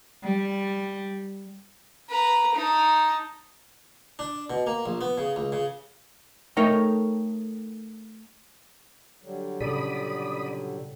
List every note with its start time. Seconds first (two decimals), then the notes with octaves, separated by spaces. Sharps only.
0.24 G3
2.09 B4 A#5
2.55 D#4 A5
4.19 D4
4.50 B2
4.67 A#3
4.86 A#1
5.01 B3
5.18 C#3
5.36 C#2
5.52 C#3
6.57 A3 D#4 A4 A#4 C#5 G5
9.23 D3 F#3 G3
9.61 A#2 C#3 A4 D5 B5 D#6